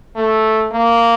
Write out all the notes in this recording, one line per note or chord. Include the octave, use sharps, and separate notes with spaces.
A3
A#3